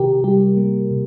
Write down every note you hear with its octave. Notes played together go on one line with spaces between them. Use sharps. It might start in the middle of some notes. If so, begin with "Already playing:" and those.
Already playing: C3 D#3 G4 A#4
G3 G4
A#3
C3